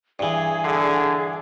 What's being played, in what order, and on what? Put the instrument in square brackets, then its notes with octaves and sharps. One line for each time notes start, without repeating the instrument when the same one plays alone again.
[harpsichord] G2 E3 [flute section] G#4
[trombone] D3